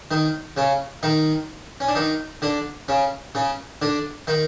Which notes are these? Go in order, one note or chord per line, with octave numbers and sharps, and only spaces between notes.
D#3 D#4
C#3 C#4
D#3 D#4
C#4
D4
D#3 D#4
D3 D4
C#3 C#4
C#3 C#4
D3 D4
D#3 D#4